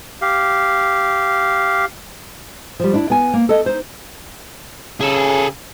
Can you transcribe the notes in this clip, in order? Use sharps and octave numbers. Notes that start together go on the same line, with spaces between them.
G4 F5
F3 G3
D4 E4
B3 G#5
A#3
A4 D#5
D#4 C5
C#3 G#4 A4